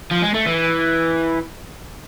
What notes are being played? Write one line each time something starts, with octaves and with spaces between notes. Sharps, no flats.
F3
G#3
A3
E3